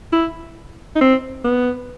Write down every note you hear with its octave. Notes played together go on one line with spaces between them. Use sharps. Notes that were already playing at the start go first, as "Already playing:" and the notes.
E4
D#4
C4
B3